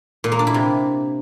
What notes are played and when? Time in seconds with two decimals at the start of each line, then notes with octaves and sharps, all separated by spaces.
0.24 A#2
0.32 A#3
0.39 D4
0.47 E4
0.54 C3